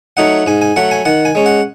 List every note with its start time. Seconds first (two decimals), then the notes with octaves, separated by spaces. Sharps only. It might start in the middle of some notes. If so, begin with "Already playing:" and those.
0.17 F#3 A3 D#4 F#5
0.46 G#2 G#5
0.61 G#5
0.76 F#3 A3 F#5
0.91 G#5
1.05 D#3 F#5
1.25 G#5
1.35 G#3 C#4
1.46 F#5